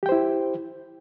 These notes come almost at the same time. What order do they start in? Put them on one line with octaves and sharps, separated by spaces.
G4 G5 C5 E4